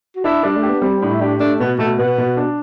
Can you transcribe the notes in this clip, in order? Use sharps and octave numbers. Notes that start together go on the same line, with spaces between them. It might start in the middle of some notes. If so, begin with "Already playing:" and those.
F#4
D4 E4
G3 D4
A3
G4
B3
G3 C4
A2 D4
E4
D4 G4
A3 D4
B2 B3
B2 A3
B2 B3
B2
D4